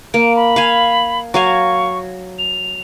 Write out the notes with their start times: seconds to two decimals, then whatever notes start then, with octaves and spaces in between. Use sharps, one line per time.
0.14 A#3 D7
0.36 B5
0.56 F5 G#5
1.34 F#3 F5 G#5 C#6
2.39 F7